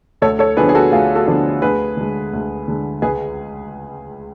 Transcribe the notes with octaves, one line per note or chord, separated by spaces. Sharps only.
D2 A4 C#5
A4 C#5
D3 F3 B3 D4 G#4 B4
G#4
F#4 A4
D2 F4 G#4
F#4 A4
D3 F3 B3 D4
D2 G#4 B4
D3 G#3
D2
D3 G#3
C#2 G#4 B4